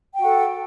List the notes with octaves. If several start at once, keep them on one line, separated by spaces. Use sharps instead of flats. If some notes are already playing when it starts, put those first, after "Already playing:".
F#4 A4 F#5 G5